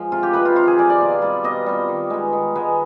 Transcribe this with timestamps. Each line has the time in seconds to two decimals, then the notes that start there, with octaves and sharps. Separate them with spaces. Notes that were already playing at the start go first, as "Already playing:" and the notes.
Already playing: F3 G#3
0.12 C3 F4
0.23 G4
0.33 F3 C4 D#4 B4
0.45 F4
0.56 C3 F4
0.67 G#4
0.78 F3 C4 D#4 D5
0.90 D5
1.01 B2
1.22 G3 C4
1.44 B2 D#5
1.66 G3 C4
1.89 D#3
2.10 G#3 B3
2.33 D#3
2.55 G#3 B3